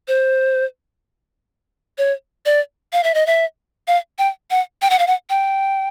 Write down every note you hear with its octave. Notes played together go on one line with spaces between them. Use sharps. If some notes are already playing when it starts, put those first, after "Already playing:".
C5
C#5
D5
F5
E5
D#5
E5
F5
G5
F#5
G5
F#5
F5
F#5
G5